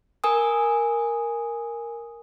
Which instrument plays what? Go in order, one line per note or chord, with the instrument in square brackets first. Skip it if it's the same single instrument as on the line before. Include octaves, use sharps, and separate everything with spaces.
[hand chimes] A#4 G#5 D#6